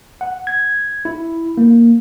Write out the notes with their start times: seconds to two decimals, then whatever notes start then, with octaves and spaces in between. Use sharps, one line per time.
0.21 F#5
0.47 G#6
1.05 E4
1.57 A#3